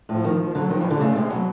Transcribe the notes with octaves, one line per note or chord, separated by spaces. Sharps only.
A2 F3
D#3
F3
D3 F#3
D#3 F3
E3
G3
D3
C#3 A3
C3 G#3
B2 F#3